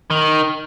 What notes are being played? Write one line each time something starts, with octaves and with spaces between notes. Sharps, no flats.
D#3